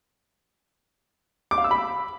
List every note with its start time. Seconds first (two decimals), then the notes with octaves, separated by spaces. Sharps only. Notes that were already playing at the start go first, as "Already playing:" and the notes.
1.51 D6
1.58 F5
1.64 E6
1.71 B5